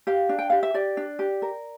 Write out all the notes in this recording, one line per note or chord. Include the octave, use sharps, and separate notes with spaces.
G4 F5
D4
G5
G4 F5
E5
G4 D5
D4
G4
A#4